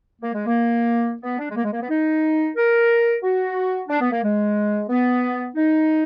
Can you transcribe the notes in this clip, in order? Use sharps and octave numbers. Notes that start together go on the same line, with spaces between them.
A#3
G#3
A#3
B3
D4
G#3
A#3
G#3
A#3
B3
D#4
A#4
F#4
D4
B3
A#3
G#3
B3
D#4